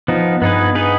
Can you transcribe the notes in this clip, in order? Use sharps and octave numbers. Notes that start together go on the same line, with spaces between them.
F3 B3 D#4
G2 B3 D#4 G#4 B4
B3 D#4 G#4 B4